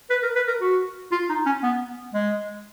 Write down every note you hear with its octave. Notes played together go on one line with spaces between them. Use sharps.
B4
A#4
B4
A#4
F#4
F4
D#4
C#4
B3
G#3